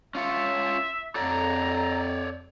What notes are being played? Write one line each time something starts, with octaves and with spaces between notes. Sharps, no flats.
C#4 F4 C#5 E5
F2 A4 C#5 D5 A#5